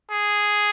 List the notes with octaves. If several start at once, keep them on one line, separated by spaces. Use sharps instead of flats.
G#4